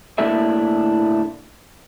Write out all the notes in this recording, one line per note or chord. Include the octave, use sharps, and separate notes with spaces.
A2 A#3 D4 E4 A4 E5